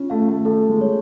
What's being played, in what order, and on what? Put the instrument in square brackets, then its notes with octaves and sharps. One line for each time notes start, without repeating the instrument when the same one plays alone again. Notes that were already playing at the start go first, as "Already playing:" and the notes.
Already playing: [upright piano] C#4 [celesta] F4
[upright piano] A3 [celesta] F5
[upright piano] A3
[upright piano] A3 [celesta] A4
[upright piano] G#3
[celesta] C#5